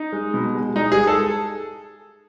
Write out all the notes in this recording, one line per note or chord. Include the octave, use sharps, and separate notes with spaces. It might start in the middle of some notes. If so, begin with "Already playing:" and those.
Already playing: D#4
G#3
B2
G#3
G#3 D#4
G#3 G#4
A4